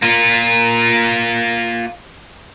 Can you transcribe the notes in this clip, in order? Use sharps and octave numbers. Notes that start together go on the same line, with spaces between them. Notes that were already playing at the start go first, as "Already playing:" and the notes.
A#3 F4